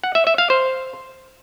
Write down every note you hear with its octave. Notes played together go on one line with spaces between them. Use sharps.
F#5
E5
E5
F5
C5